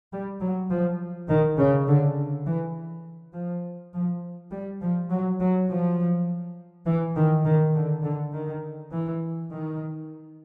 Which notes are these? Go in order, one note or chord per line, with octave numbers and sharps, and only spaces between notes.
G3
F#3
F3
D#3
C#3
D3
E3
F3
F3
G3
F3
F#3
F#3
F3
E3
D#3
D#3
D3
D3
D#3
E3
D#3